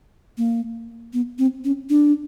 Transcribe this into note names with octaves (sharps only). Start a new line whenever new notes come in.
A#3
B3
C4
C#4
D4